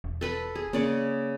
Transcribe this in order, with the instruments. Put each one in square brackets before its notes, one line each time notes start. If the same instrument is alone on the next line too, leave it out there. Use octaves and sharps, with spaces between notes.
[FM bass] E1
[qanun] A4 B4 B5
G#4
[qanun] C#3 D5 F#5 [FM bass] A#3